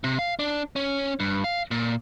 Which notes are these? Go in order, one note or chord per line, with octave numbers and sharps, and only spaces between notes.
C3
F5
D4
C#4
G2
F5
A#2